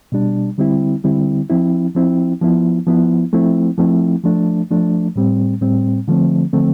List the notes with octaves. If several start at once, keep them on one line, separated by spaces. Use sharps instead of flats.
B2 G3 D4
D3 G3 C4 E4
D3 G3 C4 E4
F3 C4 E4
F3 C4 E4
F3 B3 E4
F3 B3 E4
F3 A3 C4 E4
F3 A3 C4 E4
F3 A3 D4
F3 A3 D4
A2 G3 C4
A2 G3 C4
D3 F3 A3 C4
D3 F3 A3 C4